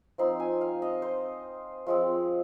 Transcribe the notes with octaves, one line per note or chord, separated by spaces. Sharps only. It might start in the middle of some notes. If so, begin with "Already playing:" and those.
F3 C4 D#4 C6
G#5
F5
D#5
C5
F3 G#3 C4